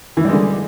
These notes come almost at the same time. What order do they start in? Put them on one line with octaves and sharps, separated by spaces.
E3 E4 G3 G#3 D3